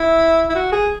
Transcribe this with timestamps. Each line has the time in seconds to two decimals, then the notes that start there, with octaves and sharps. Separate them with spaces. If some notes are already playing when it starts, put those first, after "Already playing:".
Already playing: E4
0.49 E4
0.55 F#4
0.72 G#4